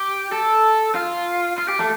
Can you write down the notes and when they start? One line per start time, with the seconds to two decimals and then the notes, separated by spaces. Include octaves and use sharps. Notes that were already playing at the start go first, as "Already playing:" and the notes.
Already playing: G4
0.32 A4
0.95 F4
1.58 F4
1.68 G4
1.79 A3